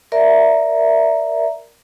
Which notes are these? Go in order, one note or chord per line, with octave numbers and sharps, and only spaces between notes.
A#4 D5 E5 A#5